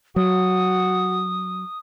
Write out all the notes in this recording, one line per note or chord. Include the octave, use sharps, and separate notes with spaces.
F#3 F#4 D#6